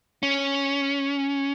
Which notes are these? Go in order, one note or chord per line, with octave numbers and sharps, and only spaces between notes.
C#4